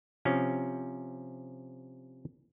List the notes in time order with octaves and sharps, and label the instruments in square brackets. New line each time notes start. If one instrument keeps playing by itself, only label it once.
[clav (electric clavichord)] C3 F3 C#4